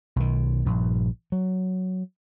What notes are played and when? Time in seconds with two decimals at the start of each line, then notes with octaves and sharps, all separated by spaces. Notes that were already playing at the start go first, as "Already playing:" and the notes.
0.16 B1 D#3
0.65 A#1 G2
1.32 F#3